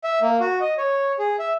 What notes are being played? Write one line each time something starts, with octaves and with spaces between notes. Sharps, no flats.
E5
A#3
F#4
D#5
C#5
G#4
E5